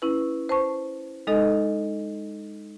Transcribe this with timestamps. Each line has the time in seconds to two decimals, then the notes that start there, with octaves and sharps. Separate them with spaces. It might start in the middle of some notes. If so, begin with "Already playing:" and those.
0.02 C#4 E4 B4
0.49 C5 A5 C#6
1.27 G#3 D#4 A4 D#5